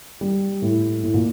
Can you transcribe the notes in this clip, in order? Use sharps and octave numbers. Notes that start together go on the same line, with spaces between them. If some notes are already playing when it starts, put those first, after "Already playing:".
G3
A2
A2
A#2